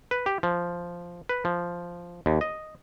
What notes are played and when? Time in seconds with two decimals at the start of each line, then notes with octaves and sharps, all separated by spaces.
0.11 B4
0.26 G4
0.43 F3
1.29 B4
1.45 F3
2.26 D#2
2.41 D#5